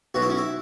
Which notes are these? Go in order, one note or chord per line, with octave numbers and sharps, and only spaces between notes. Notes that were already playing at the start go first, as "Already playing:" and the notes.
B1 B2 F#3 F#4
E4
C#4
E4